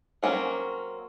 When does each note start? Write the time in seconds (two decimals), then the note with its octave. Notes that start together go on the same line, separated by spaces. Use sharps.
0.23 F#3 A#3 C4 C#4